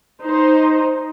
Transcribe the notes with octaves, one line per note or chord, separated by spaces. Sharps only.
D#4 C5